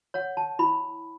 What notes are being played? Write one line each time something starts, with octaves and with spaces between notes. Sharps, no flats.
C#5 F#5
A5
E4 B5